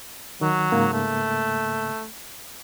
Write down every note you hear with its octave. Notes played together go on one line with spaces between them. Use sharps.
D#3 F#3
G#2 C#3 A#3
A3